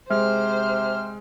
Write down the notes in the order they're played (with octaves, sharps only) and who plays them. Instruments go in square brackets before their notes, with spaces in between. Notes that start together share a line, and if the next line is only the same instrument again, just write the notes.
[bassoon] C3 [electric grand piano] G#3 [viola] C5 [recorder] F6